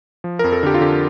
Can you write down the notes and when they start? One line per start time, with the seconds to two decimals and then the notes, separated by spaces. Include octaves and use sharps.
0.24 F3
0.39 A#4
0.44 F2
0.52 A4
0.63 D3 G4
0.74 F4
0.81 D3 G4